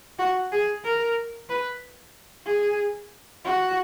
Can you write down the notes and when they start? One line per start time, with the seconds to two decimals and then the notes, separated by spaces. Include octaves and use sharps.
0.19 F#4
0.52 G#4
0.85 A#4
1.50 B4
2.47 G#4
3.45 F#4